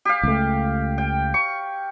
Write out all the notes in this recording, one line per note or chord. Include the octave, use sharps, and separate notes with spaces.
G4 F5
C#2 A3
G5
C#6